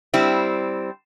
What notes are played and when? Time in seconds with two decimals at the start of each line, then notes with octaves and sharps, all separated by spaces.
0.14 G3 C4 E4